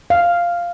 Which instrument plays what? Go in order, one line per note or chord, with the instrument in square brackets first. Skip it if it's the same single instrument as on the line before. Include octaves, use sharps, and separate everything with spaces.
[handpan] F5